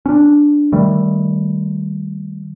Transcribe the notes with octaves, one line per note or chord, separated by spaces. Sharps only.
C#4 D4
D#3 G3 A3